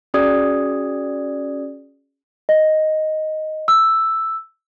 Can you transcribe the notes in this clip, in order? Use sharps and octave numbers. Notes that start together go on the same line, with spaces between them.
C#4 F#4 G#4 D5 D#6 G#6
D#5
E6